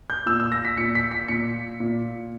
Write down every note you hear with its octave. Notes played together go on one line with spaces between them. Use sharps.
G6
A#2 E6
E6
A#6
B6
A#2 C#7
B6
B6
A#2 C#7
A#2